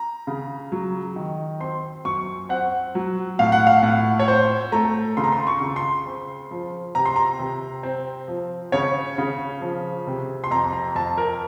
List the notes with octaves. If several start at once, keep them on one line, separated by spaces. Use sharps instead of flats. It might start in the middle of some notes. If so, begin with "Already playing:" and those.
Already playing: A#5
C#3
F#3
D#3
C4 C6
F#2 C#6
C4 F#5
F#3
A2 F5
F#5
F5
A2 F#5
C#5
C4 C5
A3 A#5
C#3 C6
A#5
C6
C#6
C#3
C6
C4
F3
C3 A#5
C6
A#5
C3
C4
F3
C#3 C#5
C#3
F3
C3
C6
F2 A#5
A#5
F2 A5
A#4